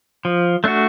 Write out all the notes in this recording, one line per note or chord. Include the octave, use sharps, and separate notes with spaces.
F3
A3 D4 F#4